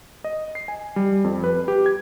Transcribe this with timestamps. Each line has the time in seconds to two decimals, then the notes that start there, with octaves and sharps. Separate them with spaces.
0.24 D#5
0.55 C7
0.68 G#5
0.96 G3
1.24 F2
1.44 B4
1.68 G4
1.86 G#6